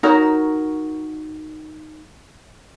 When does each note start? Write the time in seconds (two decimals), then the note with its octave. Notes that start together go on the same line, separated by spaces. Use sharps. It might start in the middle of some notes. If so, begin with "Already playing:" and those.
0.03 D#4 F#4 A#4 C#5